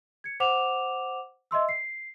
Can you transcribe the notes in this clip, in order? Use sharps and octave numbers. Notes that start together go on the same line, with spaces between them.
G#6 C#7
C5 F#5 D6 E7 F7
D#5 E5 C6 E6
C7